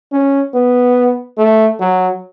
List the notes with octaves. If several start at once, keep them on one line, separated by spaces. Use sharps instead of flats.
C#4
B3
A3
F#3